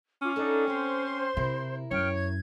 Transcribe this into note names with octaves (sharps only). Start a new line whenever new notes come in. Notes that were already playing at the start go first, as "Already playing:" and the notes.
C#4 F4 D6
D4 D#4 A4 F#5
C4 G4 C5 C6
C3 E4 A#4
F#2 C#5 G5 F6
G#6